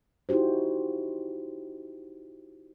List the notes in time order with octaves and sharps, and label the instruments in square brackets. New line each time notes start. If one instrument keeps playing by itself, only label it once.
[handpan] D#4 E4 F#4 G4 C5